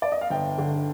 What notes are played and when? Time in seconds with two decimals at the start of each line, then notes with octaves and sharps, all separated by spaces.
0.02 D5
0.12 D#5
0.21 F5
0.30 G1 G5
0.58 D3